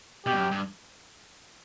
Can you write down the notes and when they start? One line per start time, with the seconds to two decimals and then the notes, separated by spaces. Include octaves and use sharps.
0.26 B2 G4
0.33 G2
0.39 F#2
0.51 G2